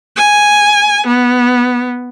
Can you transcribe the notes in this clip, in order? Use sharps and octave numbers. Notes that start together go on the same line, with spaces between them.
G#5
B3